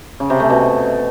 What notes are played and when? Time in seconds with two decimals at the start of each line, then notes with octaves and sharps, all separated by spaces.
0.20 C#3
0.30 C3
0.40 A3
0.50 B2